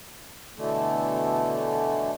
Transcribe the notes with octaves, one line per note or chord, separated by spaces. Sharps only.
B2 D3 E3 A3